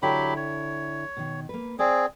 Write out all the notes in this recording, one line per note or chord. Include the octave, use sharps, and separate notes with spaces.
D3 F#3 E4 G4 G5 B5
C#5
B2 D#3
A#3 B4
C4 G#4 C5 D5